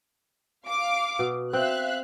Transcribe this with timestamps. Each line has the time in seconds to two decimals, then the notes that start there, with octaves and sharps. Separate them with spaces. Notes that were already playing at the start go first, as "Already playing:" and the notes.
0.66 F5 D6
1.19 B2
1.53 C4 E5 F5 F#6